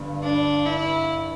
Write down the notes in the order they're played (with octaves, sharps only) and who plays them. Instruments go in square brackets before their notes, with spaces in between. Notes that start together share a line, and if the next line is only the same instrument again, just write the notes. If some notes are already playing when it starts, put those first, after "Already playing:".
Already playing: [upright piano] G1 G2
[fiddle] D4
E4